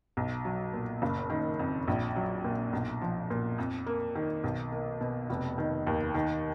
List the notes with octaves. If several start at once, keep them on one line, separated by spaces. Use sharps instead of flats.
B1
F#3
A#2
F#1
D#3
F2
A#1
F#3
A#2
B1
F3
A#2
F2
A#3
D#3
B1
A#3
B2
F1
D#3
D#2
D#3